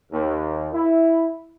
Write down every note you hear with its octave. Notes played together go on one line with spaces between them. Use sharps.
D#2
E4